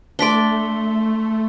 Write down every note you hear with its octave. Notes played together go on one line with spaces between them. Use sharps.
A3 D4 D5 C6 B6 G7